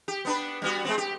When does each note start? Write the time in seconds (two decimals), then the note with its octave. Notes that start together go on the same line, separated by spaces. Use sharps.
0.08 G4
0.25 B3 D4 B4
0.62 G3 B3 F#4
0.85 G#3 B3 C4
0.98 G4